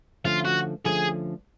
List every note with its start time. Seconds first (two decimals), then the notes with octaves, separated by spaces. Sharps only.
0.24 D3 F3 A3 C#4 F4
0.45 F#4
0.85 D3 F3 A3 C#4 G#4